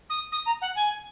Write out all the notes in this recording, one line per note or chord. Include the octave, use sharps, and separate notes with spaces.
D#6
D#6
A#5
F#5
G#5